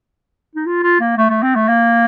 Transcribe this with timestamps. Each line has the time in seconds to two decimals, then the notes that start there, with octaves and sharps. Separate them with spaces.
0.55 D#4
0.66 F4
0.83 F4
1.00 A#3
1.17 A3
1.29 A3
1.43 C4
1.55 A3
1.68 A#3